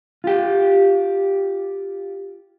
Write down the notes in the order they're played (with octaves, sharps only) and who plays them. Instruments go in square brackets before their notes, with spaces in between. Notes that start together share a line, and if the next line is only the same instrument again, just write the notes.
[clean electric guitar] F4 G4